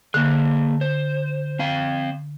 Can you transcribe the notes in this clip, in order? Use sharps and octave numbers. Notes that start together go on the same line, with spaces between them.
D3 A#3 G#4
C5
C4 F5